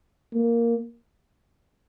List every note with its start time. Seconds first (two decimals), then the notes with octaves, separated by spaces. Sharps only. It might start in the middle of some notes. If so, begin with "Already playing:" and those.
0.34 A#3